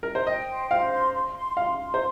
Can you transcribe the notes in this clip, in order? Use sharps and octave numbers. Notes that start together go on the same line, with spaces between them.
A#4
C5
D#5 G5
C5
C5 F5
C6
C6
C6
F5 C6
C6
C5